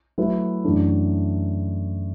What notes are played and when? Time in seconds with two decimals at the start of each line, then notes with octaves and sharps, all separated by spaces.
0.18 F#3 A3 E4 B4
0.64 F#2 E3 A3 D4